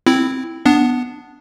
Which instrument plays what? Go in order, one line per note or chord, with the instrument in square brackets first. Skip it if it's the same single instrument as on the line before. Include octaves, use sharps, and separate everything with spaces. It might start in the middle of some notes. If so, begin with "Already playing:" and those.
[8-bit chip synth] C4 E4
B3 D4